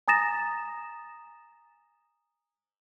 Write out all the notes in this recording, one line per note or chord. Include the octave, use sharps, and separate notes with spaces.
G#5 A#5 D#6 A6 A#6 E7